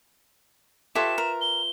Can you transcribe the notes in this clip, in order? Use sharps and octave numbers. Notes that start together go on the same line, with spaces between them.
F4 G4 A4 B4 C#5 E5 E7
A#4
G7